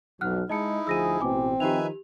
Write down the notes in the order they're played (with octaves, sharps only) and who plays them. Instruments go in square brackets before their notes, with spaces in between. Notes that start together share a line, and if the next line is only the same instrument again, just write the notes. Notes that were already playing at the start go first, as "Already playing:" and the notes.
[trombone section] B1 [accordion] F2 [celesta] F#5 F6 F#6
[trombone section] G#3 [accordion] D#4 E4 [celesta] D#5 A5 C#7
[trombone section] D2 F3 G#4 [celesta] E6 A#6 D#7
[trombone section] A1 B2 [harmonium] C4 [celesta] G#5 D6
[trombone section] D#3 F3 D#4 [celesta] G4 F7 [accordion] B4 E5 G#5